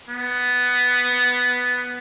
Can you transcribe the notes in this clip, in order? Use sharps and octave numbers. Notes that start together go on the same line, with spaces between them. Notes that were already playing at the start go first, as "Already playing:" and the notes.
B3